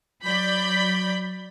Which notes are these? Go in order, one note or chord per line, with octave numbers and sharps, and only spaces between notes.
F#3 D5 B5 G6